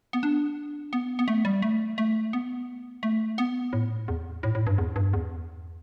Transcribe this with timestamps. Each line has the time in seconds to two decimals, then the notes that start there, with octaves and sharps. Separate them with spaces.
0.13 B3
0.23 D4
0.93 B3
1.19 B3
1.28 A3
1.45 G3
1.62 A3
1.98 A3
2.33 B3
3.03 A3
3.38 B3
3.73 A2
4.08 E2
4.43 A2
4.55 A2
4.67 G2
4.78 E2
4.96 G2
5.13 E2